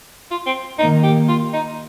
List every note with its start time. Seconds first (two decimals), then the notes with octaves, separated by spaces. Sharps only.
0.31 F4
0.46 C4
0.79 D#3 A#3 D#4
1.03 G4
1.29 F4
1.53 D#4